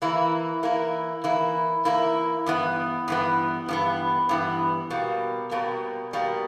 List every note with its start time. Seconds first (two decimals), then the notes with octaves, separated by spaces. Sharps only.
0.02 E3 A#3 E4
0.63 E3 A#3 E4
1.24 E3 A#3 E4
1.85 E3 A#3 E4
2.46 G2 E3 B3
3.08 G2 E3 B3
3.69 G2 E3 B3
4.29 G2 E3 B3
4.90 B2 G3 A#3
5.51 B2 G3 A#3
6.13 B2 G3 A#3